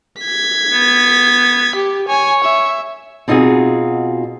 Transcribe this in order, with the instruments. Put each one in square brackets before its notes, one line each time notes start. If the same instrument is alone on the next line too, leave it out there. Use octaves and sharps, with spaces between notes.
[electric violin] G#6 B6
[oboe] B3
[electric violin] G4
[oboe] C#5 [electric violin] G#5
[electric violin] E5
[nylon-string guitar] B2 C4 D#4 F4 F#4 G#4